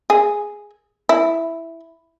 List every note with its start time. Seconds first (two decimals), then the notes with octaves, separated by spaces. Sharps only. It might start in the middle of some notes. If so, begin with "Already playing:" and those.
0.10 G#4
1.09 E4